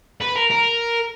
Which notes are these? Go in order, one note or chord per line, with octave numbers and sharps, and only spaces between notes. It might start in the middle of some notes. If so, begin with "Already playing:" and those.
B4
A#4
A#4